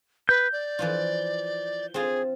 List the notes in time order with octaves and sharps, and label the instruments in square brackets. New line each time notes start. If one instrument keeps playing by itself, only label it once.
[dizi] B4 [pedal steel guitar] G6
[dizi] D5
[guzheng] E3 F3 F4
[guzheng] C4 F4 [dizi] G#4